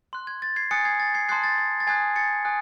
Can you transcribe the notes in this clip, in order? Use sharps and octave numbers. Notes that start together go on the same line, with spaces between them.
C6 F#6
G#6
A6
G#6 C7
G#5 D#6 F#6 A6 C#7
G#6 C7
A6
G#6 C7
A5 C6 D#6 F#6 G#6 C7
A6
A6
A6
G#5 D#6 F#6 G#6 C7
A6 C#7
G#5 D#6 F#6